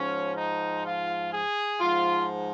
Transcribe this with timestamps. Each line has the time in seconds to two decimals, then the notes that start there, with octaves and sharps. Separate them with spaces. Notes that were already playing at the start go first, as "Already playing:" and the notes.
Already playing: G#2 F3 C#4
0.36 D#4
0.84 F4
1.32 G#4
1.80 G#2 F3 F4